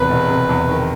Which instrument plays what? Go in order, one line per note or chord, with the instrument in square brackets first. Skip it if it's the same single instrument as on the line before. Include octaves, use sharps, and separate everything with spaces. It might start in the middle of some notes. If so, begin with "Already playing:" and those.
Already playing: [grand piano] E2 C3 [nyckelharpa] B4
[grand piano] E1
C3
E2
D#3